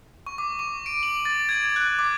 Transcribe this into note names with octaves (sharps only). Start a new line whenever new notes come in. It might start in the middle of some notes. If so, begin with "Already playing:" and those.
C#6
D6
C#6
D7
F#7
A6
G#6
F#6
D6